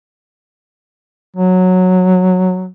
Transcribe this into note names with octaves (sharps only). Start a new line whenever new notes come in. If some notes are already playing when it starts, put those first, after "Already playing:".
F#3